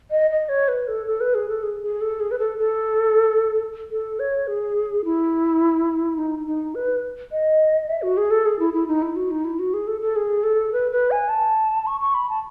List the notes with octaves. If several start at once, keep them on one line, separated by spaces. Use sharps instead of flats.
D#5
D#5
C#5
B4
A4
A4
B4
G#4
A4
G#4
G#4
A4
G#4
B4
A4
A4
A4
C#5
G#4
E4
D#4
D#4
B4
D#5
E5
F#4
G#4
A4
G#4
E4
E4
D#4
E4
F#4
D#4
E4
F#4
G#4
A4
A4
G#4
A4
B4
B4
G#5
A5
C#6
C#6
B5
A5